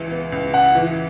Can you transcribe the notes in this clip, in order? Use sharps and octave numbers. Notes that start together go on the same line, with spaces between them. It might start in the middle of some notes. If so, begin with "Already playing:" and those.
Already playing: C#2 E3
B3
C#2
C#3 F#5
E3